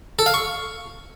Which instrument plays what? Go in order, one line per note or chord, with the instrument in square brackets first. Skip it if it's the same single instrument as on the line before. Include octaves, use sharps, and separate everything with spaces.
[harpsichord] A4
F5
C#6